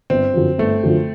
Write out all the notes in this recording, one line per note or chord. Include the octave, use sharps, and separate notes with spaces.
G1 C4
F#2 D3 F3
G1 A3
F#2 D3 F3